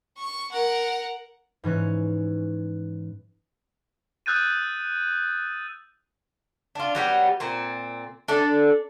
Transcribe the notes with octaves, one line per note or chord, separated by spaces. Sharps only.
C#6
A#4 F#5
G#2 E3 C#4 F#6
D#6 E6 F#6 G6 A6 D#7
D4 F4
F#3 G3 B3 G4
A#2 C4
D4 A4 D5